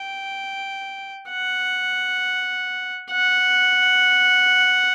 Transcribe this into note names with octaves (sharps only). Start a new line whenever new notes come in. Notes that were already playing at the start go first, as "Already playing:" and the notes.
Already playing: G5
F#5
F#5